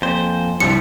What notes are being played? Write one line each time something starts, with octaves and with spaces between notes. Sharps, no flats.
F2 A#3 A4 C5 G#5
C2 G2 F3 G3 C#7